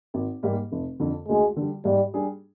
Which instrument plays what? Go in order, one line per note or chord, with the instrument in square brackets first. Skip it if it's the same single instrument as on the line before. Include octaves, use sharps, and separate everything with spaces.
[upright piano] G#1
G#2 G3 A#3
F1
F2 D3
[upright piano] D2 [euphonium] G#3
[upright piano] D3 G3
[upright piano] G#2 [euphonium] G3
[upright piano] G3 D4 G#4